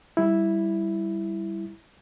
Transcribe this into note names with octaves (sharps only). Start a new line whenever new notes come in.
G3 E4